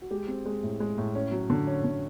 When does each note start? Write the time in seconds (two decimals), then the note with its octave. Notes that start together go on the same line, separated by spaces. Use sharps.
0.02 F#4
0.11 G#3 G4
0.28 C4
0.46 G#3
0.63 A2
0.80 G#3
0.98 A2
1.15 C#4
1.32 F#3
1.50 D3
1.67 C#4
1.84 D3